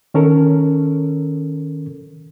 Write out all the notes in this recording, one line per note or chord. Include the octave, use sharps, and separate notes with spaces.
D#3 C#4 A4 A#4